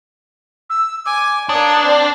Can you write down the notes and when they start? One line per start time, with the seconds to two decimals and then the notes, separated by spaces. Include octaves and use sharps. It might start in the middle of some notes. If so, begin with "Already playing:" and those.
0.70 E6
1.06 G#5 D6
1.49 A#3 D4 C#5 D#6
1.83 C4 D5